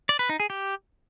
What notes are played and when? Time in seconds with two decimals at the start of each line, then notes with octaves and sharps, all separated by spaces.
0.09 D5
0.19 B4
0.29 D#4
0.40 G#4
0.50 G4